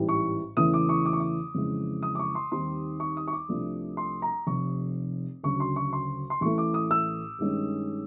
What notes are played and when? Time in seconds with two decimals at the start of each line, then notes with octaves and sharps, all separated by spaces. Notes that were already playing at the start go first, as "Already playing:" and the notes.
Already playing: A1 G#2 E3 G3
0.09 C#6
0.57 E2 C#3 E3 A3 C#4 D#6
0.74 D6
0.89 C#6
1.06 D6
1.13 C#6
1.20 D6
1.55 F2 C#3 E3 G#3
2.03 D#6
2.15 D6
2.19 C#6
2.35 C6
2.52 D#2 D#3 G3 C4 D#4 C6
3.00 C#6
3.17 D#6
3.28 C#6
3.33 D6
3.49 C2 C3 F3 A3 D4
3.97 C6
4.22 A#5
4.47 F1 F2 C3 C#6
5.43 D2 C#3 F#3 C#6
5.60 C6
5.76 C#6
5.93 C6
6.30 C6
6.41 A1 A2 E3 A3 C#6
6.58 D6
6.74 D#6
6.91 E6
7.38 G2 D#3 G#3 C#4